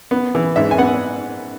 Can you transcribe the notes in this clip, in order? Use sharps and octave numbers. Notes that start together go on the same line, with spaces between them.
B3
E3
G#2 E5
G#5
B3 F#5